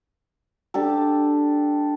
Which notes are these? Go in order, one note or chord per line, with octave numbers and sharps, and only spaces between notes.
D4 G4 A4